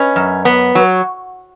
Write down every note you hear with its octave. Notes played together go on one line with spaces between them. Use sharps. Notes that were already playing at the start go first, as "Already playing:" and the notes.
Already playing: C#4 B4 D#5
F#2
B3
F#3